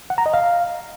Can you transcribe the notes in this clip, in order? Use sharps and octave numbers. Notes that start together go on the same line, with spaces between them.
F#5
A#5
D#5
F5